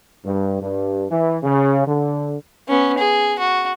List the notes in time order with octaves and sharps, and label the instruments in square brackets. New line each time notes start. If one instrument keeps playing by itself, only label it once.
[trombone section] G2
G2
E3
C#3
D3
[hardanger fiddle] B3 C#4
G#4
F#4